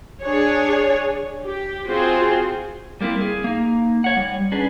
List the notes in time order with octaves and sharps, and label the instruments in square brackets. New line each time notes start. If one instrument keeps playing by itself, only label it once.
[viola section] D4 G#4 C#5
G4
C4 F4 F#4 G#4 C5
[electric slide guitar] G3 A#3 C4 E4
G#4
A#3 D#4
C#5 F#5
G3
C#4 D4 G#4 B4